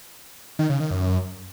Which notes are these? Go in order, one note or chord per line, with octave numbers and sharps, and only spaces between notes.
D#3
C#3
D#3
F#2